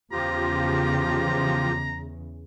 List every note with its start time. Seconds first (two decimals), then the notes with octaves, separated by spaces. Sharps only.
0.12 E2 C#3 F3 F4 G4 A#5